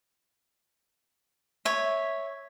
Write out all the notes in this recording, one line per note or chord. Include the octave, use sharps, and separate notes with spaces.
C#5 E5